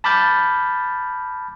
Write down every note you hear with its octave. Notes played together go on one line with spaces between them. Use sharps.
A5 B5 D6 F6 G6 A6